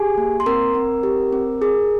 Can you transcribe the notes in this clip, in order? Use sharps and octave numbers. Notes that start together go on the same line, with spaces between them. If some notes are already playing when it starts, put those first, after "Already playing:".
Already playing: G4 G#4 G#5
A#3
C6
C4 A#4 A#5
C4
G4
C4
G#4